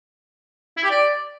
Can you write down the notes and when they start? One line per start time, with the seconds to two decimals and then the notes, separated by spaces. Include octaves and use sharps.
0.77 E4
0.84 G4
0.90 D5